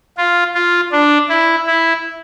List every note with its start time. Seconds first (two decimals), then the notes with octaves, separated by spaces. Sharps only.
0.18 F4
0.55 F4
0.92 D4
1.29 E4
1.67 E4